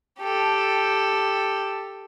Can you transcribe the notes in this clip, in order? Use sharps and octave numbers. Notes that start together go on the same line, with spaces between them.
G4 A4